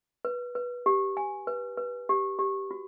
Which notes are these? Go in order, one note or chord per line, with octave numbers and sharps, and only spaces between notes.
B4
B4
G4
G#5
B4
B4
G4
G4
F#4